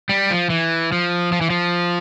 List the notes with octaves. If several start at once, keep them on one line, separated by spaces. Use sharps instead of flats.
G3
F3
E3
F3
F3
E3
F3